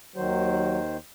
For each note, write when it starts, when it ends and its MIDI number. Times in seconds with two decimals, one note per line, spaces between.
0.16 0.97 39
0.16 0.97 51
0.16 0.79 54
0.16 0.97 72